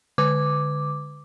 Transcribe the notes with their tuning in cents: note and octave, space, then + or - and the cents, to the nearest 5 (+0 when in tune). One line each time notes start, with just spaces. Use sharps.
D3 +0 D6 +0